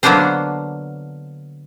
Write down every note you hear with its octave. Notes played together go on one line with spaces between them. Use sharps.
D3 F#3 A#3 B3 D4 C5